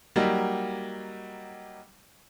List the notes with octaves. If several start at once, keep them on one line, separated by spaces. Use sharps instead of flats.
F#3 G3 A#3 D#4 G4